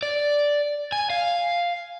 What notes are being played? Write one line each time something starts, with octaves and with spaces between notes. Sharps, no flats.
D5
G#5
F5